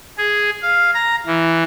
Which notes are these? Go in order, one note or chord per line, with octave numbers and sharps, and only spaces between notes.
G#4
F5
A#5
E3